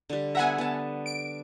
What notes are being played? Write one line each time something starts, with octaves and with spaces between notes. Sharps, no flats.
D3 G3
B3 E5 F#5 G#5 A#5
B3 A5
D7